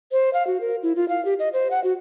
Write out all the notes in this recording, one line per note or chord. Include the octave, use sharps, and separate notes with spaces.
C5
F5
F#4
A#4
E4
F4
F5
G4
D#5
C5
F#5
F#4